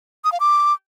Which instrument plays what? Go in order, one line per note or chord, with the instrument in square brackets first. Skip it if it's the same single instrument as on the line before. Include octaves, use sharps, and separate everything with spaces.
[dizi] D#6
F5
D6